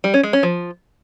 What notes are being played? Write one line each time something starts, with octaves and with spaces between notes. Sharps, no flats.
G3
C#4
G#3
C#4
F3